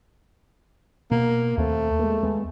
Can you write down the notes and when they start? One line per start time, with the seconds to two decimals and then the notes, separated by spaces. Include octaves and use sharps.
1.11 B2 A#3
1.57 D#2 A3 C4
1.99 G#3 A#3
2.23 D#2 G#3 B3